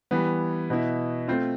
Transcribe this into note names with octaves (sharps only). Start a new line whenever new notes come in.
E3 G3 B3
B2 B3 E4
A3 C4 F4